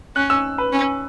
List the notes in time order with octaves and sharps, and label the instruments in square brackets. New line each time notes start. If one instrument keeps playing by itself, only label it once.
[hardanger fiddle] C#4 [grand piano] F#6
[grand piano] E6
B4
[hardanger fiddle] C#4